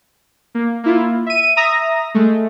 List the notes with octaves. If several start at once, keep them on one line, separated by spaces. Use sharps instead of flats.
A#3
A#3 E4 F4
E5 D#7
E5 A#5 D#6 A#6
G#3 A3